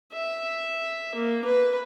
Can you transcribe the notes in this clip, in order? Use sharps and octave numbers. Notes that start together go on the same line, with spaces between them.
E5
A#3
B4